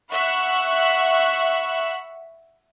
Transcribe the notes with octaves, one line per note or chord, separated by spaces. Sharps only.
E5 F#5 B5 C#6 F#6